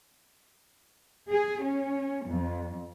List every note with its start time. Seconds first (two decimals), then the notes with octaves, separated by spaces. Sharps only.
1.30 G#4
1.64 C#4
2.29 F2